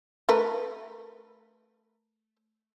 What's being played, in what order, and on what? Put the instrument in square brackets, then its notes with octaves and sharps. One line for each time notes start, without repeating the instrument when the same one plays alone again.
[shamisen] A3 A#4 B4